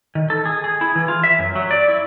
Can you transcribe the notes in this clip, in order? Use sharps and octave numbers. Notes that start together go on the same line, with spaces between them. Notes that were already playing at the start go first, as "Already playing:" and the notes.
D#3
A4
G#4
G#4
E4
E3
F4
E5
F#2
F#3
D5
E4